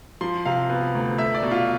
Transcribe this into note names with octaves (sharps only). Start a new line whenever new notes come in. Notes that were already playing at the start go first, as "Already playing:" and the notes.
F3 C6
C3 F5
B3
D2
A3 E5
D5
B2
F4